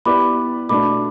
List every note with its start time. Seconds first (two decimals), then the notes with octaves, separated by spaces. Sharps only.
0.05 B3 E4 G4 B4 D5 B5 D6
0.69 B2 A3 D4 B5 D6